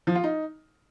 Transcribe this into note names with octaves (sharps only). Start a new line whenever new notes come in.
F3
F4
D#4